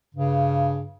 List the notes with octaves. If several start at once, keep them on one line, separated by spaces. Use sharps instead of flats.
G2 C#3